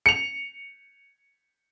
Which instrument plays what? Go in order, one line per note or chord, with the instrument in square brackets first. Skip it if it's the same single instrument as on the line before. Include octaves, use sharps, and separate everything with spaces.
[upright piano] C#7 F7